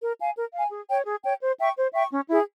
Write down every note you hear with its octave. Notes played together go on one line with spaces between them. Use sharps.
A#4
F5 G#5
A#4
F5 G#5
G#4
C#5 G5
G#4
C#5 G5
C5
E5 G5 C#6
C5
E5 G5 C#6
C#4
E4 G#4